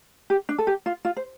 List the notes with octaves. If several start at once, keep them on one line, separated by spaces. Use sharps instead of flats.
G4
D4
A4
G4
F4
F4
C5